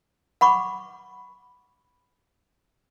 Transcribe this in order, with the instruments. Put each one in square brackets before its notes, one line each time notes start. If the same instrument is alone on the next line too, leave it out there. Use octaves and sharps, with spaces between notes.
[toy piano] F#5 B5 C#6 D6